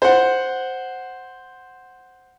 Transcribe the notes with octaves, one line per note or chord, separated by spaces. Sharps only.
C5 F#5